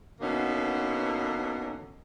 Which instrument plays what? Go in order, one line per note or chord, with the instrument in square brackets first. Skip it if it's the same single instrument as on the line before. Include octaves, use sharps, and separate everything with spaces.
[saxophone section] B2 D3 E3 A#3 C#4 D#4